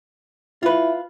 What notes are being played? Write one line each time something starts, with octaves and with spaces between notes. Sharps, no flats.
E4 F4 B4